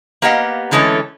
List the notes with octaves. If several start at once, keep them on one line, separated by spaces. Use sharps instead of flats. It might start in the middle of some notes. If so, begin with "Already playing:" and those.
A#3 B3 G4 D#5 F5 F#5
D3 E3 G#3 A3 C#4 A4